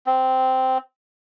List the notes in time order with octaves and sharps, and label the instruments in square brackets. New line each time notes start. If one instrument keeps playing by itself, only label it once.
[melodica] C4